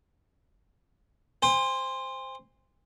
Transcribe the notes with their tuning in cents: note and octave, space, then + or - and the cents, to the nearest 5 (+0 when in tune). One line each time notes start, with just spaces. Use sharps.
C5 +0 G#5 -45